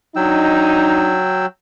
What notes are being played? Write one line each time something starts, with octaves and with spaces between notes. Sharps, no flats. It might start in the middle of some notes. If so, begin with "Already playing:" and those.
F#3 D4 D#4 G5 E6